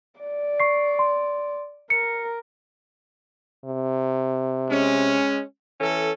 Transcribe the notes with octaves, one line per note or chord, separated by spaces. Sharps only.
D5
C#6 C7
C6
A#4 C#7
C3
G#3 C#4
E3 C#4 A4